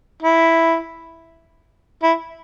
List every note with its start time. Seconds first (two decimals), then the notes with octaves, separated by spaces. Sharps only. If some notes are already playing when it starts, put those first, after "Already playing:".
0.23 E4
2.03 E4